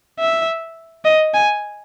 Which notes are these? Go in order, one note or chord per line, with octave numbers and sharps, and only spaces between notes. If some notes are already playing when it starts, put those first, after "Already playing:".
E5
D#5
G#5